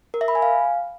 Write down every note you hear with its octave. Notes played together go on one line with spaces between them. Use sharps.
A#4
E5
B5
G#5
F5